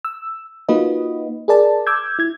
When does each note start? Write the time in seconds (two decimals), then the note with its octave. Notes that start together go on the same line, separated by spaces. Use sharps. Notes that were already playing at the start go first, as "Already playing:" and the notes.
0.05 E6
0.69 A#3 D#4 F4 F#4 B4 D#5
1.48 G#4 A#4 D5 A5
1.87 D6 E6 G6 G#6
2.19 E4 G#6